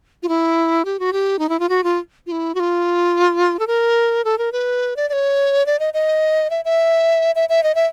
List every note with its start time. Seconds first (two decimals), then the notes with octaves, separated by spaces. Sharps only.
0.23 F4
0.29 E4
0.85 G4
1.00 F#4
1.13 G4
1.39 D#4
1.49 E4
1.60 F4
1.69 F#4
1.84 F4
2.27 F4
2.32 E4
2.55 F#4
2.60 F4
3.60 A4
3.67 A#4
4.25 A4
4.38 A#4
4.52 B4
4.96 D5
5.09 D5
5.13 C#5
5.66 D5
5.79 D#5
5.94 D#5
6.50 E5
6.65 E5
7.35 E5
7.49 E5
7.63 D#5
7.75 E5